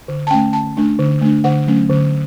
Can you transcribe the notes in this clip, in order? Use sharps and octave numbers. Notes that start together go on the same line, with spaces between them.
D3
A5
A3 C#4 G5
D3 A5
A3 D4
D3
A3 D4
D3 F#5
F#3 A3 C#4
D3